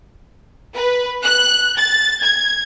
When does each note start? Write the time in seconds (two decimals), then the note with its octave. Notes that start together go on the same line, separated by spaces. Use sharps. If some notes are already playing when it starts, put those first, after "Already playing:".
0.75 B4
1.25 F#6
1.76 A6
2.23 G#6